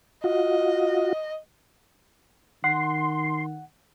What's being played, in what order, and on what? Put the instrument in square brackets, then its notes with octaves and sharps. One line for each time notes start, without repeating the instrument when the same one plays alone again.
[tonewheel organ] F4 F#4 [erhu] D#5
[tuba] D#3 [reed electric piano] F#5 [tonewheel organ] C6